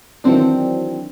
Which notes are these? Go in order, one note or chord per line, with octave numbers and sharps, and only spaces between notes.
D#3 E3 F#3 C4 D4